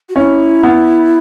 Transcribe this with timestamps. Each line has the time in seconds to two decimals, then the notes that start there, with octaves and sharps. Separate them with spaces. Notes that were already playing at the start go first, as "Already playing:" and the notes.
0.09 F#4
0.16 C#4 E4
0.63 B3